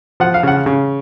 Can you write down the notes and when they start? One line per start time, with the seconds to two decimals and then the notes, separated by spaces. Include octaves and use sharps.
0.20 F3 F#5
0.34 F5
0.43 C#3 F#5
0.66 C#3